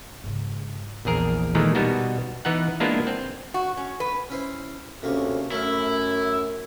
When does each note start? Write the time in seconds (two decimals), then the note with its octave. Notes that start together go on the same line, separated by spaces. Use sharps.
0.24 G#2 C#3
1.05 A#1 E2 G#4 A#4
1.55 A#2 D#3 E3 G#3 A3
1.75 B2 G3 B3 D#4 F#4
2.45 E3 B3 D#4 F#5
2.80 G#3 A#3 B3 D4 E4 F4
3.07 C4
3.54 F#4
3.77 C#4
4.00 B4
4.30 C#4 E4 C5
5.02 D2 C3 A#3 C#4 C#6
5.52 F#2 A3 C#4 E4 A#4